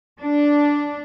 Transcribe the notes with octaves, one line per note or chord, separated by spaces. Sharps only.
D4